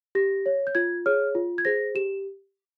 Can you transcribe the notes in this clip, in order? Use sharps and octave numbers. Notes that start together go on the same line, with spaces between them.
G4 A#6
C#5
G6
F4 G#6
G#4 C#5 F6
F4
G#6
G#4 C5 A#6
G4 E7